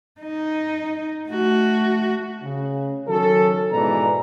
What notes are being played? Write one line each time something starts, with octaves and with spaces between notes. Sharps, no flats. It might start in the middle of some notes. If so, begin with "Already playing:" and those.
D#4
A3 F#4
C#3
D#3 F#3 C#4 A4
G#2 B2 E3 B4 D5 A#5